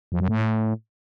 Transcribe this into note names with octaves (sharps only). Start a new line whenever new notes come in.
F2
F#2
A2